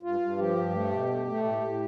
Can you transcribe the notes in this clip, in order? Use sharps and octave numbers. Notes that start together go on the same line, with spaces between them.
G2 F4
G2
F3 G4
G2
A3
B2
A3
A3
A2 G4
A2